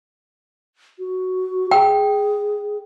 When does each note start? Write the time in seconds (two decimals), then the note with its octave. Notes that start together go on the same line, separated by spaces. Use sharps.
0.99 F#4
1.71 G#4 G5